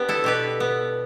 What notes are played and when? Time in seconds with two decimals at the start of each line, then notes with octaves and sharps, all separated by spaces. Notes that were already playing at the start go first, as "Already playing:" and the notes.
Already playing: B3 D4 G4
0.09 E4 A4
0.24 B2 G4 B4
0.60 B3